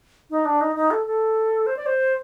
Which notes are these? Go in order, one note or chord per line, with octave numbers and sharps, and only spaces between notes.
D#4
D4
D#4
D#4
A4
A4
C5
D5
C5